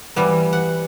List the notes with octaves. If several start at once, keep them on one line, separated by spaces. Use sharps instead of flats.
E3 G3 B3
F#5